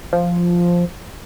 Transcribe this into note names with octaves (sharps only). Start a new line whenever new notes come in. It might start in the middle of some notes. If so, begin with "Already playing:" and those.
F3